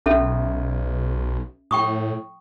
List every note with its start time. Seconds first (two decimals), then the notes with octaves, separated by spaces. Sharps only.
0.06 B1 C#4 A4 E5
1.71 A2 G5 C#6 D#6